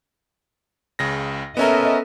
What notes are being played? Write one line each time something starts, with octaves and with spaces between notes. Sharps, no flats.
C#2 C#3 A#6
B3 C#4 A4 A#4 D#5 E5